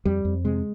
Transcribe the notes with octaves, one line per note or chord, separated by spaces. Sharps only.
F2 G3
F2
C3 G#3